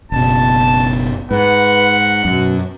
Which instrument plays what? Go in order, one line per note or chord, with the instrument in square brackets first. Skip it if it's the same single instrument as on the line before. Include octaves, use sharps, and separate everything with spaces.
[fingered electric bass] F#1 B2 [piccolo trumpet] A5
[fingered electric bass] G#2 [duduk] B4 [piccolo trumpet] F#5
[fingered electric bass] F#2 [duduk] B2